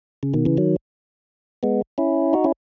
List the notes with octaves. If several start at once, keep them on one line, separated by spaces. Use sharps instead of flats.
C#3
B2 D#3
C#3 E3
D#3 F#3
G#3 B3
C#4 E4
D#4 F#4
C#4 E4